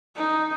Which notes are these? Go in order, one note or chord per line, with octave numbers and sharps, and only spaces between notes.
D#4